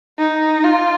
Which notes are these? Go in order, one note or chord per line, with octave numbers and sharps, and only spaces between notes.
D#4
F4